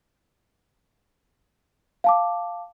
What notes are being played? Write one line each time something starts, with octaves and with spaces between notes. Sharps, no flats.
F5 A5 D6